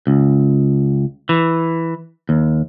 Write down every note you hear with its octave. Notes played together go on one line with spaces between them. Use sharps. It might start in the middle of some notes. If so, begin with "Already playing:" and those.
C#2
E3
D#2